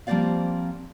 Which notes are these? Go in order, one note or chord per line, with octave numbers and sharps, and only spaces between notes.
F3 G3 A#3 C4 D5 F5